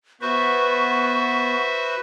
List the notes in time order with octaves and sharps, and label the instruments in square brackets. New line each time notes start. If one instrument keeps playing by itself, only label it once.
[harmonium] B3 [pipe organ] F#4 C5 E5 [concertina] B4 [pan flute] C#6